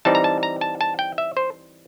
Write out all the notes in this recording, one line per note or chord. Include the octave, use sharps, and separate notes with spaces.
E3 G3 C4 D#4 A5
A#5
A5
A#5
A5
A5
G5
E5
C5